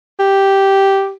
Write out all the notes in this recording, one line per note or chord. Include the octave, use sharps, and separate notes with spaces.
G4